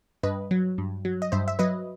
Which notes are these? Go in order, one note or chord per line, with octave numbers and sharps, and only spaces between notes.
G2 B4 D#5
F#3
G2
F#3
D#5
G2 C5 E5
E5
F#3 B4 D#5